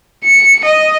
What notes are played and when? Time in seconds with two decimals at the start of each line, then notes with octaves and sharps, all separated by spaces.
0.25 C#7
0.65 D#5